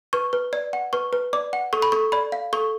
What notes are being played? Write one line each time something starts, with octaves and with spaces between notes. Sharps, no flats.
B4 C#6
B4
D5
F#5
B4 C#6
B4
D5 D6
F#5
A4 C#6
B5
A4 C#6
D5 B5
F5
A4 C#6